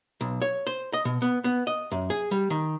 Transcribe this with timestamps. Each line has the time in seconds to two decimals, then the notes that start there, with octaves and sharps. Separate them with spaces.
0.21 B1
0.42 C#5
0.67 C5
0.93 D#5
1.05 B2
1.22 B3
1.44 B3
1.67 D#5
1.91 F#2
2.10 G#4
2.31 G3
2.50 D#3